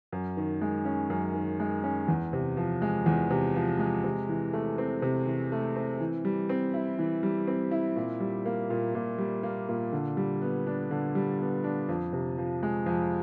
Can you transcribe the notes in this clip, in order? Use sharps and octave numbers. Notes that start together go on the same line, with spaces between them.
F#2
D#3
G#3
C#4
F#2
D#3
G#3
C#4
E2
C3
F3
G#3
E2
C3
F3
G#3
C3
E3
A3
C4
C3
E3
A3
C4
E3
G3
C4
E4
E3
G3
C4
E4
A#2
G3
A#3
A#2
A#2
G3
A#3
A#2
D3
G3
B3
D4
D3
G3
B3
D4
F2
C3
F3
G#3
F2